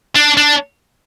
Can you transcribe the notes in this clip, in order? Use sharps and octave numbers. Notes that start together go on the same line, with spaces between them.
D4
D4